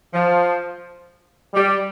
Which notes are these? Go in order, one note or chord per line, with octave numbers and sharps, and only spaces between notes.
F3
G3